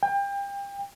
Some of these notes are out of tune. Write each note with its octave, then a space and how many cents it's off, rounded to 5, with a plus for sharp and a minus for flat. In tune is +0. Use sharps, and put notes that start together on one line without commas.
G5 +30